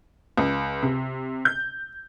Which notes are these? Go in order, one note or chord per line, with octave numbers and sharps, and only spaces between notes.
C#2
C3
G6